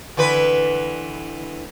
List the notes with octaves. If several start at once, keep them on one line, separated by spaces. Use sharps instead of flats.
D3 E3 B4